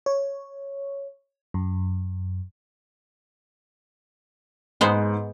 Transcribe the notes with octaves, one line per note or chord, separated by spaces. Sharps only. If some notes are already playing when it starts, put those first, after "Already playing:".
C#5
F#2
G#2 G#3 B3 C5